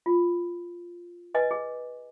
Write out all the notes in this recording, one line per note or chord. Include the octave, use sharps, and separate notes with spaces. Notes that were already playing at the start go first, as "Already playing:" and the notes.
F4
B4 D#5 G#5
G#4